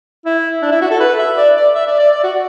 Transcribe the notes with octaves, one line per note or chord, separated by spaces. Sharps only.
E4
D4
E4
F#4
A4
B4
E5
D5
D5
E5
D5
D5
D5
F#4